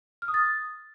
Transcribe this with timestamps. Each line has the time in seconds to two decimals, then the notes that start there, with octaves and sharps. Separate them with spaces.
0.22 F6
0.28 D#6
0.34 A6